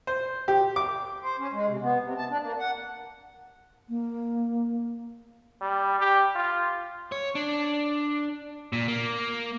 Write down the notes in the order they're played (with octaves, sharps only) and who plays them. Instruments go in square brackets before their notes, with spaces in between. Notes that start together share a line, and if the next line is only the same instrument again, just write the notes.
[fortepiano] C5
G4
D6
[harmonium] C5
C#4
G#3
C3
B3
C3
A5
D4
A#3
F#5
[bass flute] A#3
[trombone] G3
G4
F4
[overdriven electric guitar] C#5
D4
A#2
A#3